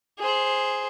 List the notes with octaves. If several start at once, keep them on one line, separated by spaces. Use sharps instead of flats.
G#4 C5